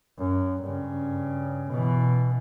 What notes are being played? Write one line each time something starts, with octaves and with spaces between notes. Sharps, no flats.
F#2
G2 C#3
B2 E3